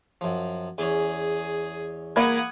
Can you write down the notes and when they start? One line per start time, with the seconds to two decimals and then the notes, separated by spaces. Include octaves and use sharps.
0.21 F#2 F3
0.78 E2 C#4 G#4
2.16 A#3 F#5 B5 D#6 G#6